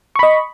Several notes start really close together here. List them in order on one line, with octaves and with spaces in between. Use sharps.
C#6 B5 D#5